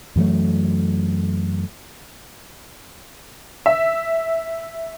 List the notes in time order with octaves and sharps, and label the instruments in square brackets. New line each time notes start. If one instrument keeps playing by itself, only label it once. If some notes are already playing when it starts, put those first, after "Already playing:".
[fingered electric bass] F#2 E3 F#3 A3
[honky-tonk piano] E5